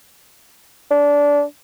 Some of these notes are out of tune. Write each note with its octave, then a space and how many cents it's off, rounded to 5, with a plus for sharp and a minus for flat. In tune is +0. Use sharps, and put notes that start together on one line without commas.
D4 -20